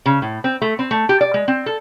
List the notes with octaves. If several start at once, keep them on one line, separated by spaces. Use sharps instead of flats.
C#3
A2
C4
A3
C4
A3
G4
D5
G#3
C4
A4